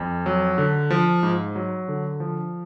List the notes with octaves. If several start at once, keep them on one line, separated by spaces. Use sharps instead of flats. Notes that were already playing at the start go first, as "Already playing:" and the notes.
Already playing: F2
F#3
D3
F3
G#2
F#3
D3
F3